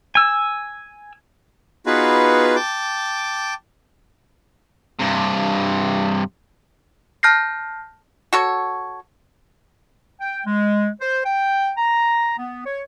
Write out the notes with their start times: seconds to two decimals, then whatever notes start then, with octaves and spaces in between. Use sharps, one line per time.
0.15 G#5 E6
1.86 B3 D#4 F4 F#4 G#4 B4
2.56 G5 A5 D6
5.00 G2 C3
7.23 A5 F6 G6 A#6 C7
8.33 F#4 A4 C#5
10.20 G5
10.46 G#3
11.01 C5
11.26 G5
11.77 A#5
12.38 B3
12.66 C#5